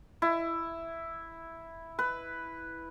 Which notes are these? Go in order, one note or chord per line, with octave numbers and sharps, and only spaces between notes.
E4
B4